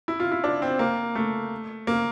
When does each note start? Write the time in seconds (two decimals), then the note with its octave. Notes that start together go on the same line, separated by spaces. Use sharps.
0.08 E4
0.20 F4
0.32 E4
0.44 D4
0.62 C4
0.79 A#3
1.15 A3
1.87 A#3